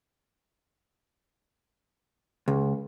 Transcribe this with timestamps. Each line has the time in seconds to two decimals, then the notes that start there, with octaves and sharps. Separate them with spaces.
2.48 C#2